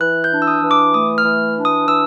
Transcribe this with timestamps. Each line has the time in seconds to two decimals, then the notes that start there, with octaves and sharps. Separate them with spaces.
0.01 E3 F#6
0.24 G6
0.32 D4
0.42 E6
0.47 D#6
0.63 E3
0.71 D6
0.94 A3 D#6
1.18 F6
1.25 E3
1.56 D4
1.65 D#6
1.88 E3 E6